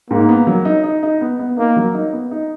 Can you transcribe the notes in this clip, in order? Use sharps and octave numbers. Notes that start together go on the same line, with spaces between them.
G#2 A#3
B3
F#3
D#4
D#4
D#4
B3
B3
A#3 D#4
F#3
D#4
B3
D#4